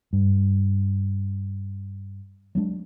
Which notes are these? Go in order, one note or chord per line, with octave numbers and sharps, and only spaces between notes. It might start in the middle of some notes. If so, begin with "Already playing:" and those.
G2
F#3 G#3 A#3 D4